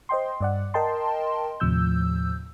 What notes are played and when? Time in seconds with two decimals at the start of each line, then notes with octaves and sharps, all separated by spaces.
0.09 C5 D#5 G5 C6
0.41 G2 D5 F#5
0.74 A#4 D#5 G5 A5 C6
1.60 D#2 A2 C3 F3 E6 G6